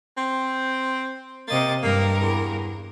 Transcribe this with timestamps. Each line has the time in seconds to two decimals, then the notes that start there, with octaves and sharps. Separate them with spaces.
0.17 C4
1.48 C3 A#3 D#5 A6
1.83 G2 A#3 A#4
2.21 E2